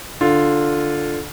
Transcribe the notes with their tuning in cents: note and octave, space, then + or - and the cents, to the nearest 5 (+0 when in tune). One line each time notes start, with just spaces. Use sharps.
D3 +0 F4 +0